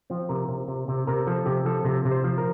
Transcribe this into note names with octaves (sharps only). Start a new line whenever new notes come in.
F3 C4
C3 A#4
C3
C3
C3
C3 A#4
F3 A4
C3 G4
F3 A4
C3
C3
C5
F3
A#4